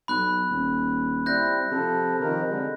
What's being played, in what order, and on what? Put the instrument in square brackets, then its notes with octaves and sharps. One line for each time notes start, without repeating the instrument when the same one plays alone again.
[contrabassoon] B1 [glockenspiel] B5 F#6
[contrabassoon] D#1
[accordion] G3 C4 E4 [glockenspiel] F#6 G6 A#6
[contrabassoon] C3 [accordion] F3 A4
[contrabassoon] C3 [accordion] D#3 F3 A#4
[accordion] D3 G#3